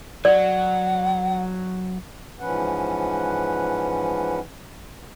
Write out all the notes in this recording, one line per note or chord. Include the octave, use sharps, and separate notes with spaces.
F#3 D5 F#5
G#2 E3 F3 C#4 B4 F#5